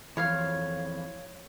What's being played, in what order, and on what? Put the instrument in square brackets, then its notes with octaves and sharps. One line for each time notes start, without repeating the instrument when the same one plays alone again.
[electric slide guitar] F2 E3 [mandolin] C#5 F5 F6